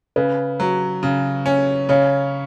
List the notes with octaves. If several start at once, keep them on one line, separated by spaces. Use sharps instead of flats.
C#3 B4
F#3
C#3
C#4
C#3 C#5